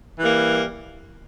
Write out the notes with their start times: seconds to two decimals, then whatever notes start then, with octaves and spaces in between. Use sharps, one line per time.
0.19 E3 G3 A#3